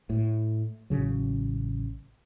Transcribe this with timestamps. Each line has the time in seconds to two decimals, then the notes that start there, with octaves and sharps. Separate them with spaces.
0.10 A2
0.90 A1 C#3 F#3